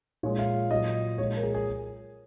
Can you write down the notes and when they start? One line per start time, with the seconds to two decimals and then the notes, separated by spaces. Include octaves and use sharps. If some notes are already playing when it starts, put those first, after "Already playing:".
0.23 A#2 F3 G#3 C#5
0.39 F5
0.71 A#2 F#3 D#5
1.18 A#2 F3 G#3 C#5
1.37 A#4
1.43 G#4
1.54 G#4